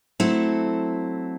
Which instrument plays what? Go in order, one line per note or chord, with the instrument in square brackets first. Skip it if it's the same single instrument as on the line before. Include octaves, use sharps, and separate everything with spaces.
[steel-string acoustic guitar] F#3 A3 C4 E4 A4